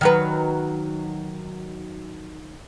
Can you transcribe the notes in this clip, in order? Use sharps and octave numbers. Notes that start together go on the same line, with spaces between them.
D#3 F#3 B4